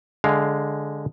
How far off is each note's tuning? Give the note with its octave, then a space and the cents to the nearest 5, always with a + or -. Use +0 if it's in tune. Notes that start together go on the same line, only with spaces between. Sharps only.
D3 -10 G#3 +0 F5 +0